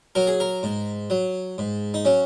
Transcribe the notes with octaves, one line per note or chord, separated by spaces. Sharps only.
F#3 A#4
G#4
A#4
G#2
F#3
G#2
D#4
F#3 C#4